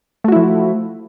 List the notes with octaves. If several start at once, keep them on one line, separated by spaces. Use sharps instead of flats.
F3 A3 E4 F#4